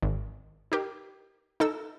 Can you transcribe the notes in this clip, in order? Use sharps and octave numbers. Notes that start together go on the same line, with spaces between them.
G#1
D#4 G4 A#4
D#4 A4 E6